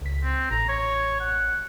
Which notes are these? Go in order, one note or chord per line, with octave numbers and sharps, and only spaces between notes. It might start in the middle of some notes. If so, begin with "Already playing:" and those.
C#2 B6
C4
A1 A#5
C#5
F#5